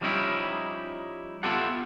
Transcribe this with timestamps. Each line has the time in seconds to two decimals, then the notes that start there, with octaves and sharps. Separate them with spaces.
0.01 F3 G3 C#4 D#4 E4 G4
1.43 B3 E4 F4 G4 A4 F#5